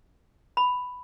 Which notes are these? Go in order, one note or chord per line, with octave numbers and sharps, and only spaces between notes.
B5